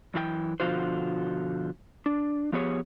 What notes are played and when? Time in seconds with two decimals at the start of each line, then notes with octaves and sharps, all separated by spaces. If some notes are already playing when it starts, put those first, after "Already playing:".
0.14 F#2 E3 F#4 G5
0.60 B2 D3 F3 F4 F#4 C5
2.06 D4
2.52 F3 B3 G4 G#4 C#5